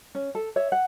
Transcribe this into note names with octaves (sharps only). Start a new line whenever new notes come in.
C#4
A4
C#5 E5
F#5